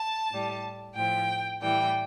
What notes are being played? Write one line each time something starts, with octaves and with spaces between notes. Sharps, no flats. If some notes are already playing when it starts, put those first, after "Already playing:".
Already playing: A5
A2 G3
A2 F3 G5
A2 E3 G3 G5